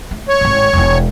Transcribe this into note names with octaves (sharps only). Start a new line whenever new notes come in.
A3
C#5
G#1 A2
E1 E4